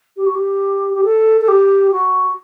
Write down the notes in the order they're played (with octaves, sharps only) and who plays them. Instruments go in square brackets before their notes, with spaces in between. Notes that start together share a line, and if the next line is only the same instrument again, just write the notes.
[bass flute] G4
F#4
G4
G4
A4
A4
G4
F#4